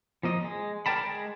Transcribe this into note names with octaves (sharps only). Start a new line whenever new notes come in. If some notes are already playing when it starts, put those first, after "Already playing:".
F3 A#3 D#5
G#3
A#4 D5 G5 A5 B5
G#3